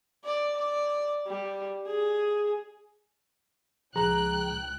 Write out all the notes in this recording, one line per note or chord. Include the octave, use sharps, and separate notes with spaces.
D5
D5
G3
G#4
C#2 F3 G#4 G5 A#5 F#6